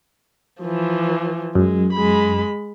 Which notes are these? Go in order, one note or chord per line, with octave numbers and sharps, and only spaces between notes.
E3 F3
F#2 G#3
G#3 B5